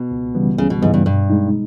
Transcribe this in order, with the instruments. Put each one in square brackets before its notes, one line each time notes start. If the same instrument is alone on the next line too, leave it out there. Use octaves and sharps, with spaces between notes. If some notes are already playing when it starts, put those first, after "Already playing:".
Already playing: [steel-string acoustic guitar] B2
[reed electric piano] C#2
C#3 E3 G3 B3
[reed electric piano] C#2 [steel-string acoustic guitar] C#3
[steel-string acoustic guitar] B2
[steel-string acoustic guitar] G#2 [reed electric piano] C#3 E3 G3 B3
[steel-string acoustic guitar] G2
[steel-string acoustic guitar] G2 [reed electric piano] B2
[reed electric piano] G#3 D#4